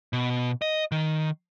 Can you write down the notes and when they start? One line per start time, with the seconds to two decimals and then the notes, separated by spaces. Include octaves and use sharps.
0.13 B2
0.62 D#5
0.92 D#3